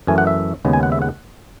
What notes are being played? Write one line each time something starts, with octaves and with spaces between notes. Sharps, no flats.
F#2 E3 A3 G#5
F#5
E5
D#2 C#3 G#3 B3
G#5
F#5
E5
F#5